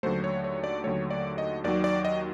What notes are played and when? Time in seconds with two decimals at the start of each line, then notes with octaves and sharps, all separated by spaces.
0.03 D#2 D3 F#3 A3 C5
0.24 C#5
0.44 C#5
0.64 D5
0.84 D#2 D3 F#3 A3 C#5
1.11 D5
1.38 D#5
1.64 D#2 D#3 F#3 D5
1.84 D5
2.05 D#5